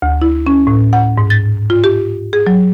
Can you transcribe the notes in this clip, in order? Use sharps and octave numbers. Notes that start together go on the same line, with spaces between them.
D2
E4
C#4
A2
F#5
G#2
A6
F4
G4
G#4
F#3